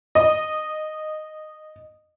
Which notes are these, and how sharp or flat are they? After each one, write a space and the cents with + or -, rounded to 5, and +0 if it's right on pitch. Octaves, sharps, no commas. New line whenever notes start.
D#5 -15